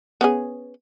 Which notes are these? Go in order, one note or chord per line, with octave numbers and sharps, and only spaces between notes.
B3 C#4 G#4